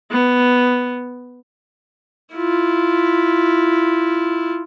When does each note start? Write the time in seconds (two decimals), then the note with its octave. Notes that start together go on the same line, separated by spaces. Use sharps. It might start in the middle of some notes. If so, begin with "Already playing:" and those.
0.11 B3
2.34 E4 F4